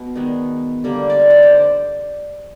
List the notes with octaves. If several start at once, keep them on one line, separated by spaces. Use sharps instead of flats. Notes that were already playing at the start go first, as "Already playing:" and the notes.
Already playing: B2
D#3 G#3 B3
D3 G3 A#3
D5
C#5
C5
D5